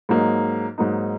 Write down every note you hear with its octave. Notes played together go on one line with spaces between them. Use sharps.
G#2 F#3 A#3 D#4
G#2 F#3 A#3 D#4